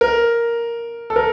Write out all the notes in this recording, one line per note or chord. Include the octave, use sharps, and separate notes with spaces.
A#4
A4
A#4